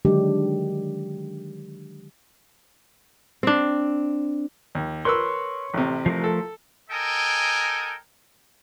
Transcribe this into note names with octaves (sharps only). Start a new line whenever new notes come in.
D3 D#3 F#3 G#3 D4 G4
C4 D4
D#2
A#4 B4 C#5 C6 E6
A1 C3
F3 A3 A#4
A4
A4 A#4 D#5 G5 G#5